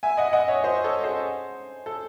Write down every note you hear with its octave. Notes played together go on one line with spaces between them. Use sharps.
E5 G#5
D#5 F#5
D#5 F#5
C#5 E5
C5 D#5
A4 C#5
G#4 C5
A4